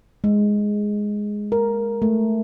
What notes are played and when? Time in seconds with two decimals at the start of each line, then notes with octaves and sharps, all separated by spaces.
0.24 G#3
1.52 A#4
2.02 A3